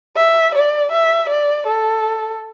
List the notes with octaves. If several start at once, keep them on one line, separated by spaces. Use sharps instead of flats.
E5
D5
E5
D5
A4